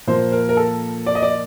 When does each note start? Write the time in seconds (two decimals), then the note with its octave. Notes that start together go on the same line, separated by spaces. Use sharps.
0.07 A#2 F3 A#3 C5
0.32 A#4
0.49 A#4
0.57 A4
1.06 D5
1.15 D#5
1.22 D5